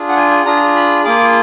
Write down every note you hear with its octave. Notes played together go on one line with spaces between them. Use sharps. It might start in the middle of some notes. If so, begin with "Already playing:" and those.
Already playing: D4 F4 G#4
F#5
G#5
G#5
D4 F4 G#4 A#5
B5
A#3 F4 G#4 D6